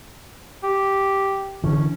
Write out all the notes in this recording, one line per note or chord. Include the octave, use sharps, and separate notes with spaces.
G4
D3 E3 C#4